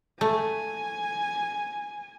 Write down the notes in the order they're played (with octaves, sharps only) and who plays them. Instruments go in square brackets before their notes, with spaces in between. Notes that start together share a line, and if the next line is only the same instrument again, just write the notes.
[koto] A3 [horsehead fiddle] G#5